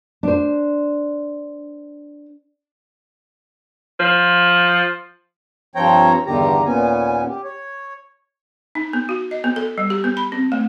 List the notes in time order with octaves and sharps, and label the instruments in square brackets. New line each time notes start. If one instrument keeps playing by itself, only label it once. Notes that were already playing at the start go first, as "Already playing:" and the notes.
[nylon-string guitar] D4 C5
[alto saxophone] F3
[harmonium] G2 F3 C4 C#5 G5 A#5
E2 G2 D3 D#3 G4 A#5
D#2 A#2 B3 C#4 G#5
G4
C#5
[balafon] D#4
B3
F#4
D#5
B3
A4
G3
G4
B3
B5
C4
A3